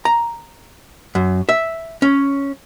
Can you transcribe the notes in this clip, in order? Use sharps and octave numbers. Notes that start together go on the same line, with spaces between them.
A#5
F#2
E5
C#4